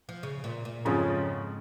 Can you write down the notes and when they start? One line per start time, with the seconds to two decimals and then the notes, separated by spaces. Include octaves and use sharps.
0.09 F3
0.23 C#3
0.44 A#2
0.65 A#2
0.85 F2 G#2 C#3 F3 G#3 C#4